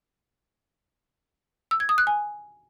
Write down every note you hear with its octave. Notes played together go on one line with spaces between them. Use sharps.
E6
G#6
D#6
F#6
G#5